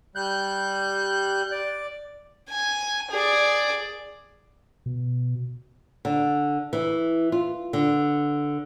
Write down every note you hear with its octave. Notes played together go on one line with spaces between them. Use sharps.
G3 F#6 G6
D5
G#5
G#4 D5
B2
D3
E3
F4
D3